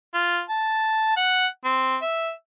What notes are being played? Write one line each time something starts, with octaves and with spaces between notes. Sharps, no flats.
F4
A5
F#5
C4
E5